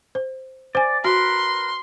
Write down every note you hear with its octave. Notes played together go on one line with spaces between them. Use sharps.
C5
C5 D5 G#5
F#4 A#4 B4 C6